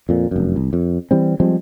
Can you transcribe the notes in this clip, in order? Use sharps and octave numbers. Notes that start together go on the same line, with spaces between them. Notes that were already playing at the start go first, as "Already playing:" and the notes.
F2 A#2
F1 F#2
C2
F2
E3 G3 C4
F3 G3 G#3 C4